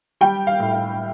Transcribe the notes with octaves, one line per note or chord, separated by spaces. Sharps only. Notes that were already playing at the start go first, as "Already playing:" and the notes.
G3 G5
F5
A2
F5